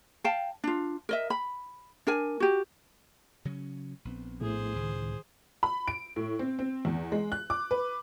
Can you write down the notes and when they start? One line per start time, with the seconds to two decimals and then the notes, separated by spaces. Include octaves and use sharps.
0.24 F5 G5 A5
0.64 D4 F4
1.09 A#4 D#5 E5
1.30 B5
2.07 D4 A#4 G#5
2.40 F#4 G4
3.45 C#3 F#3 C#4
4.05 A#1 B3 C4
4.41 A2 A3 E4 G#4 C5
4.76 C#2 D#3
5.63 B5
5.88 D7
6.16 A2
6.39 C4
6.59 C4
6.85 E2
7.12 G#3
7.32 F#6
7.50 D6
7.71 B4